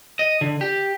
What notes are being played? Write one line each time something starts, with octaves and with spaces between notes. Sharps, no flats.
D#5
D3
G4